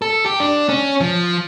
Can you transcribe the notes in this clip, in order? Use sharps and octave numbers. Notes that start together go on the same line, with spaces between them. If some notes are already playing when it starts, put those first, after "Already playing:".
A4
G4
D4
C#4
F3